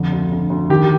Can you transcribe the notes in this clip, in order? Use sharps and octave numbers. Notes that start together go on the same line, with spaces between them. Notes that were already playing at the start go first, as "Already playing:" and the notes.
Already playing: F2 D3
D2
D2
D2
D#3 G4